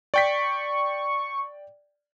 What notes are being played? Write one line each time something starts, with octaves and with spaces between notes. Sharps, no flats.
D5 G5 C#6 B6